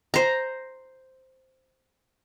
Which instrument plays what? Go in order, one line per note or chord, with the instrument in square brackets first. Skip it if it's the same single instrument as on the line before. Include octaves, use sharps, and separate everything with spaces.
[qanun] C5 A#5